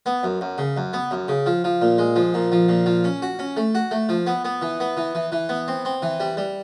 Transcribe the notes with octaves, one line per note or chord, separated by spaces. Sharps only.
B3
F#2
F#2
C#3
F#2
B3
F#2
C#3
F3
F3
A#2
G#3
F3
A#2
F3
A#2
F3
C#4
F#4
C#4
A3
F#4
A3
F3
B3
B3
E3
B3
E3
E3
E3
B3
C4
C4
E3
G3
G3